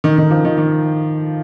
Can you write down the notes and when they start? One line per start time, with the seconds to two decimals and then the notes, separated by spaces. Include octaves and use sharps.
0.04 D#3
0.18 D#3
0.30 F3
0.45 D#3
0.58 D#3